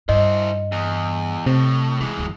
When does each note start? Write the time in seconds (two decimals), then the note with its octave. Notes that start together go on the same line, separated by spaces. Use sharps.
0.09 G2 E4 C5 D#5
0.72 E2
1.46 A2 C3
2.00 E3 G#3 A3
2.18 G1 D2